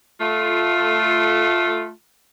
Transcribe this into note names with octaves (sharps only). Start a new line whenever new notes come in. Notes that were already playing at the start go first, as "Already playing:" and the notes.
A3 F4